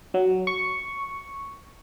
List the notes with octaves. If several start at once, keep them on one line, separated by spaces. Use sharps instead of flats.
F#3
C#6